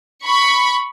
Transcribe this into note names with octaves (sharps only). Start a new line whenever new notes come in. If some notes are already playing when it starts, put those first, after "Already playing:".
B5 C#6